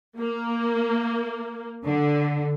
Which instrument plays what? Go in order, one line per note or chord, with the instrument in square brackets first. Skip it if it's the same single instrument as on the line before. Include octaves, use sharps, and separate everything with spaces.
[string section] A#3
D3